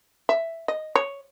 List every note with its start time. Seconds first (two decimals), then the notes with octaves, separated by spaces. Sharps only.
0.29 E5
0.68 D#5
0.96 C#5